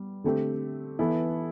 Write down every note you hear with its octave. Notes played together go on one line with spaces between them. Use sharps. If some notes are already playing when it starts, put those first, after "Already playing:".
Already playing: G3 B3
D3 A3 C4 G4
E3 B3 E4 A4